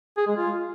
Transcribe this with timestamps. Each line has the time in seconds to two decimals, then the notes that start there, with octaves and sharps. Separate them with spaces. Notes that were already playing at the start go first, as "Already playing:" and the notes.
0.18 G#4
0.27 G#3
0.37 F4